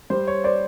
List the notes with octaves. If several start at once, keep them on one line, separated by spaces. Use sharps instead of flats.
G3 C5
C#5
C5 D5